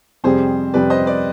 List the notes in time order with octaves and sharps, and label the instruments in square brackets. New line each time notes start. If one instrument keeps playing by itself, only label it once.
[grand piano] F2 C3 G3 [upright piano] G#4 C5
[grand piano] F2 C3 G3 [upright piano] B4 D5
[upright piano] C5 D#5
B4 D5